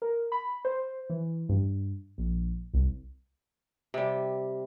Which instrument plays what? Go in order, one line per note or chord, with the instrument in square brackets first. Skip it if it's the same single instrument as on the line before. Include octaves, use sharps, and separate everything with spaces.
[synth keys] A#4
B5
C5
E3
G2
A#1
C2
[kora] C3 G3